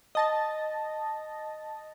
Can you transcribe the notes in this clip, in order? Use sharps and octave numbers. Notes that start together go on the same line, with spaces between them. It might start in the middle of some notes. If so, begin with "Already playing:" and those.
D#5 A5 A#6